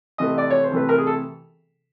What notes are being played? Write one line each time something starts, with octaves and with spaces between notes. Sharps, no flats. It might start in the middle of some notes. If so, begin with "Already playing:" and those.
C3 E3 A3 D#5
D5
C#5
C5
C3 E3 A3 B4
A#4
G#4
A4